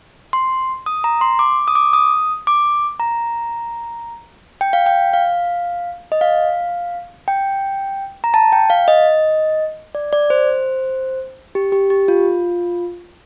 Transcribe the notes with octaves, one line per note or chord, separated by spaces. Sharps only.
C6
D#6
A#5
C6
D6
D#6
D6
D#6
D6
A#5
G5
F5
G5
F5
D#5
F5
G5
A#5
A5
G5
F5
D#5
D5
D5
C5
G4
G4
G4
F4